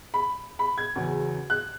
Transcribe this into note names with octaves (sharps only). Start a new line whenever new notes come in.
B5
B5
G#6
E2 C#3 F#3
F#6